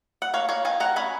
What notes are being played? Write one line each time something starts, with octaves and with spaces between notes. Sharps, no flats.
F#5
A#3 C#5 F5
A#3 C#5 F5
D#3 F5 G#5
D#3 F#5 A#5
C#4 G#5 B5